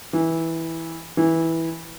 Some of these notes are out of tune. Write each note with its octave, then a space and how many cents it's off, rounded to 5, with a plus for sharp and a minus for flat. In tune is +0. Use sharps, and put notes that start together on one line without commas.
E3 -10
E3 -10